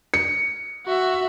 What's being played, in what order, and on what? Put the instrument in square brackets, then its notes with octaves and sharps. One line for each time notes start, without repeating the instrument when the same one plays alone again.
[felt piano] C#7
[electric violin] F#4 E5